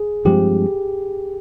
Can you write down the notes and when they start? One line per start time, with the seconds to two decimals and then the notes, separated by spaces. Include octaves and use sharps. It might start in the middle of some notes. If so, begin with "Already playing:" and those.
Already playing: G#4
0.25 G2 F3 G#3 C4 G4